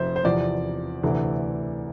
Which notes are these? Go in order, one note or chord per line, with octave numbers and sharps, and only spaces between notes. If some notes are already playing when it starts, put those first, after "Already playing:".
Already playing: F1 F2 C5 E5
C5
E2 C3 F3 D5
D2 C3 E3 A3